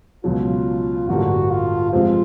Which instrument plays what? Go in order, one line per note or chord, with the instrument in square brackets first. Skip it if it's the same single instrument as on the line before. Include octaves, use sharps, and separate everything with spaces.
[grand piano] C#2 B2 F#3 [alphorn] F4
[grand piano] A1 G2 D3 G3 A#3 [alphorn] F#4
[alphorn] F4
[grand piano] C3 F3 G#3 C4 [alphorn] F4